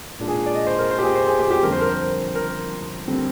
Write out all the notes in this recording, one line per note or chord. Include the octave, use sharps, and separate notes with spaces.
A#2 G#3 D4 F4
G#4
D5
D#5
C5
A#4
C5
G4
G#4
C5
G#4
G4
G4
F2 D3 G3 A#4
C5
A#4
C5
A#4
D3 G3 C4